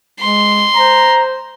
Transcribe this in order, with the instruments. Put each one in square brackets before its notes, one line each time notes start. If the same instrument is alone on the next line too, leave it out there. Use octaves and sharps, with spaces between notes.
[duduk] G#3 [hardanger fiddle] C6
[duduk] C5 [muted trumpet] A#5